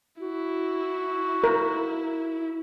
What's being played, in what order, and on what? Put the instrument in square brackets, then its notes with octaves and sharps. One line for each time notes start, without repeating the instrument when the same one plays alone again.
[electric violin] E4 [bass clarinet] F#4
[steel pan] A#4